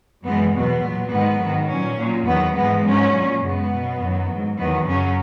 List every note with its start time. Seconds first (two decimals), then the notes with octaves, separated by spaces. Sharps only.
0.24 F#2 E3 G#3 B3
0.53 E2 B2 F#3 B3
0.82 A#2 F#3
1.10 G#2 D#3 G#3 B3
1.40 G#2 D#3 F#3
1.69 A#2 F#3 C#4
1.97 A#2 F#3
2.26 E2 D#3 F#3 B3
2.55 G#2 E3 G#3 B3
2.84 G#2 F#3 C#4
3.14 A#2 F#3
3.42 F#2 C#3 G#3 B3
3.71 B2 F#3
4.00 F#2 D#3 F#3
4.29 G#2 F#3
4.57 E2 D#3 F#3 B3
4.86 F#2 C#3 F#3 C#4